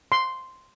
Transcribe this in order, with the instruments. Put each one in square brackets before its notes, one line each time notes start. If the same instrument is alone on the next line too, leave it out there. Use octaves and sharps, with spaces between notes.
[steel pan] C6